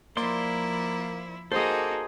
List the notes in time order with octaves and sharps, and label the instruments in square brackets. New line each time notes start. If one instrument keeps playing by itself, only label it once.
[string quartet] F3 E4 [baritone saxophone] A#3 [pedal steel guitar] C5 D5 C6
[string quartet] A#3 D#4 F#4 [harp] G#4 C5 [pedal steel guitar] A4